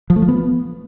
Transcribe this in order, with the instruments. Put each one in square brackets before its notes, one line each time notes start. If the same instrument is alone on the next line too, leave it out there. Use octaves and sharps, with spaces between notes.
[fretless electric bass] F3
A3
F3
B3